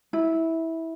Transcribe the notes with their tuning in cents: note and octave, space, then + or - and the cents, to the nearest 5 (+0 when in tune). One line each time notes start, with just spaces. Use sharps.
E4 -15